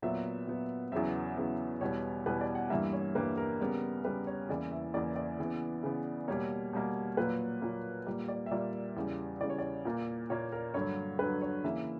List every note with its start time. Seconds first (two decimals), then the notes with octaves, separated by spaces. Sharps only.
0.02 A#2 F#3 B3 E5
0.47 A#2 F#3 B3
0.92 E2 C#3 F#3 B3 E5
1.37 E2 C#3 F#3 B3
1.81 E2 B2 G3 B3 C#5
2.26 E2 B2 G3 B3 B4
2.41 D5
2.55 F#5
2.70 G2 E3 G3 A#3 E5
2.93 C#5
3.15 G2 E3 G3 A#3 B4
3.38 A#4
3.60 C#3 G3 B3
4.05 C#3 G3 B3 B4
4.27 C#5
4.49 E2 C#3 E3 A#3 D5
4.72 E5
4.94 E2 C#3 E3 A#3 D5
5.16 D5
5.39 C#3 E3 B3
5.83 C#3 E3 B3
6.28 B2 G3 A#3 C#5
6.73 B2 G3 A#3
7.17 A#2 F#3 A#3 B4
7.62 A#2 F#3 A#3
8.06 A#2 G3 A#3
8.28 D5
8.46 E5
8.51 A#2 G3 A#3 D5
8.96 E2 C#3 G3
9.40 E2 C#3 G3 D5
9.50 C#5
9.58 D5
9.85 A#2 A#3
10.30 A#2 A#3 C#5
10.52 A#4
10.74 G2 D3 F#3 C#5
11.19 G2 D3 F#3 B4
11.42 C#5
11.64 C#3 E3 A#3 E5